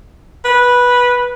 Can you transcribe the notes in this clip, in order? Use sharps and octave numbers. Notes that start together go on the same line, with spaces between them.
B4